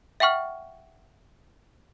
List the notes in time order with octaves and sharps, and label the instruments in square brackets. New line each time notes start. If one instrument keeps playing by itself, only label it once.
[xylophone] E5 F#5 G5 C#6 F6